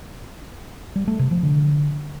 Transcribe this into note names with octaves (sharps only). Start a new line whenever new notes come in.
G3
A3
C3
F3
D3